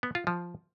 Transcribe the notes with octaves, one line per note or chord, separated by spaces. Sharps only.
B3
F4
F3